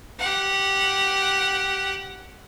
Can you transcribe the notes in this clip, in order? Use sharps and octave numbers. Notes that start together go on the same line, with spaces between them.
G4 F#5